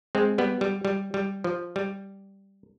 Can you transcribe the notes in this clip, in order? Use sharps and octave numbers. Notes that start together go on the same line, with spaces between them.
G#3 C4
G3 B3
G3
G3
G3
F3
G3